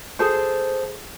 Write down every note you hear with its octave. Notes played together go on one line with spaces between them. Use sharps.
G#4 A4 C5